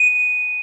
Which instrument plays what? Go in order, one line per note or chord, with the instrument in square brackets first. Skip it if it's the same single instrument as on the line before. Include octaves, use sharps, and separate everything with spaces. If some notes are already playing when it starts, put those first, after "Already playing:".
Already playing: [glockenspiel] D#7